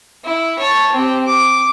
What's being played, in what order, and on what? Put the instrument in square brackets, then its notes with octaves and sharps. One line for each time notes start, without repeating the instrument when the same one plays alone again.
[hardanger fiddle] E4
C#5 A5
C4 G4
D6